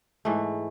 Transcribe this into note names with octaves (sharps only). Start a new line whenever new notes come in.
G#2 E3 A3